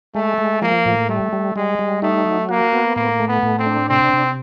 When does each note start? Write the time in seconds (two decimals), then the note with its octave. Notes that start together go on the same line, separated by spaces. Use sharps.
0.15 G#3 A3
0.38 G#3
0.62 F3 A#3
0.86 A2
1.09 G3 A3
1.33 G3
1.56 G3 G#3
1.79 G3
2.02 A3 D#4
2.25 F#3
2.49 A#3 F#4
2.73 B3
2.96 A2 A#3
3.20 A3
3.28 B3
3.43 A2
3.59 C4
3.66 D4
3.89 C3 C4
4.13 C3